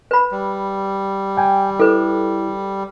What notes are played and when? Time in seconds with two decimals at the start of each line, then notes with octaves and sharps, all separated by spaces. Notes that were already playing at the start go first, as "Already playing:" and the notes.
0.11 B4 B5
0.31 G3
1.37 G5 G#5
1.80 E4 A4 B4